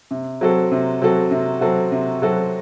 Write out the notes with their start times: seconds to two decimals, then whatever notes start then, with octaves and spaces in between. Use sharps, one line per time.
0.11 C3
0.41 F#3 C4 F#4 A4
0.72 C3
1.02 F#3 C4 F#4 A4
1.31 C3
1.61 F#3 C4 F#4 A4
1.92 C3
2.22 F#3 C4 F#4 A4